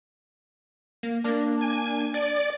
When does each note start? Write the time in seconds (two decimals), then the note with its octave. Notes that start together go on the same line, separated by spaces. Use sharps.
1.03 A#3
1.24 A#3 D4
1.61 G#5
2.14 D5